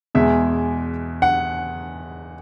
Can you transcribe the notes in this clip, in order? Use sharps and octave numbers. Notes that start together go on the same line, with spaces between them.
E2 B2 G#3 E5
F#5